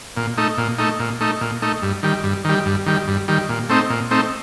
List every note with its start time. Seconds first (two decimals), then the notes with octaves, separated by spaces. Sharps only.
0.17 A#2
0.38 A3 D#4
0.58 A#2
0.79 A3 D#4
1.00 A#2
1.21 A3 D#4
1.41 A#2
1.62 A3 D#4
1.82 G2
2.03 D#3 G3
2.24 G2
2.44 D#3 G3
2.66 G2
2.86 D#3 G3
3.07 G2
3.28 D#3 G3
3.49 A#2
3.69 A3 C4 D#4
3.90 A#2
4.11 A3 C4 D#4